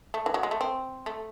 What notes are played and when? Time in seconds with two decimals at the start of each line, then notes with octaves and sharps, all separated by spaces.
0.14 A3
0.26 E3
0.34 F#3
0.43 G#3
0.51 A3
0.61 C4
1.06 A3